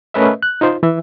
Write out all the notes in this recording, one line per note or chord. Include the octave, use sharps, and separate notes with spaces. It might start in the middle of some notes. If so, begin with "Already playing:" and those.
A3 C#4 A#4 B4 D#5 E5
F#6
D#4 F4 C5
E3 E5